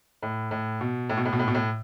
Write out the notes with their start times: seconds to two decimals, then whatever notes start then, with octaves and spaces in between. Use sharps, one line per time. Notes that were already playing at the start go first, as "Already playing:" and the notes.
0.23 A2
0.51 A2
0.81 B2
1.10 A2
1.17 B2
1.25 A2
1.33 B2
1.39 A2
1.48 B2
1.55 A2